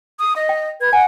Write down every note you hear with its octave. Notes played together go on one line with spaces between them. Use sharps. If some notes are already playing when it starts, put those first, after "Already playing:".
D#6
D#5
G5
B4 G#6
F#5 G#5